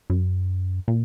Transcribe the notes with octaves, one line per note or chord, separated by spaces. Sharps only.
F#2
A#2